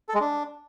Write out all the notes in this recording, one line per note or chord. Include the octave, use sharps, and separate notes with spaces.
A4
G#3
D4